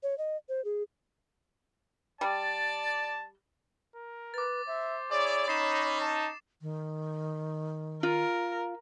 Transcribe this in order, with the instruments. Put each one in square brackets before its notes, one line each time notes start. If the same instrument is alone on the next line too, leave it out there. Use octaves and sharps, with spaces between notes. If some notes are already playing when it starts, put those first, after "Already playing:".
[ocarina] C#5
D#5
C5
G#4
[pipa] G3 [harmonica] D5 [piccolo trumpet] A5
[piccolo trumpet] A#4
[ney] B4 [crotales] D6 A6
[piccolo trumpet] C5 [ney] E5
[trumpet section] E4 G#4 D5 [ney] C#5 [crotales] D6
[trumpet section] C#4 D#4 [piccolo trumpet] B5 [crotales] A6 C7 E7
[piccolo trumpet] A5
[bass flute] D#3
[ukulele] F4 [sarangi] A#4